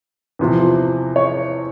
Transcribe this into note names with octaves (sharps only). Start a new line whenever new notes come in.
E2 C3 F3
C#5